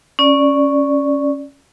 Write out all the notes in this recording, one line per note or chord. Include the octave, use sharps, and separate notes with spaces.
C#4 D5